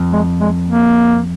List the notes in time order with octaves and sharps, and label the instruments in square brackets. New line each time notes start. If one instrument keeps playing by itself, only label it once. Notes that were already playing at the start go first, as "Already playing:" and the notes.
Already playing: [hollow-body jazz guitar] F2
[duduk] G#3
G#3
A#3